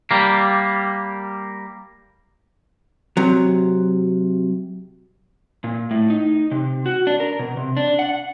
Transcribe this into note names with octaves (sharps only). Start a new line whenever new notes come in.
G3 A#3
C3 F#3
A#2
A2
D#4
C3
F#4
D4
A#4
B2
C3
D4
F#5